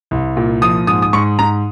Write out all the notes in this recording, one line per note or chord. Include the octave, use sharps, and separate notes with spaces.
C2
A#2
F3 D#6
G#2 D#6
D#6
G#2 C#6
G#2 A#5